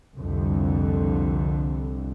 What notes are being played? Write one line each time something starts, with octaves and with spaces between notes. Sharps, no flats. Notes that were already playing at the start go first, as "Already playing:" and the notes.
C2 F2 D3